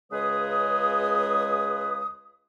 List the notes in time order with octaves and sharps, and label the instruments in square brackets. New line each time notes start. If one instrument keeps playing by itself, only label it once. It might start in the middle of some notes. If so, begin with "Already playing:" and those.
[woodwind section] C#2 C#3 G#3 G#4 B4 D#6